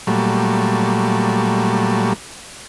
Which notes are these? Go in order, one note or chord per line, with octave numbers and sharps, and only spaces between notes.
A#2 F#3 G3 A3